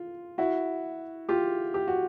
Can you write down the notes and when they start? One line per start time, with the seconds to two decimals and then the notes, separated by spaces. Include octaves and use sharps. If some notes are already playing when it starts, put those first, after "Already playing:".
Already playing: F4
0.38 E4 F#4
1.29 F4 G4
1.74 G4
1.88 F#4